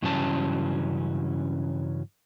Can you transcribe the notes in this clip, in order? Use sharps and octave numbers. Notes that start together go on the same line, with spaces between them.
G2 C#3 E3 F#3 C#4 A5